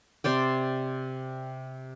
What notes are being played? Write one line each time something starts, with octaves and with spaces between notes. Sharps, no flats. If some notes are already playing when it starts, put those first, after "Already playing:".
C3 C5 D5 G5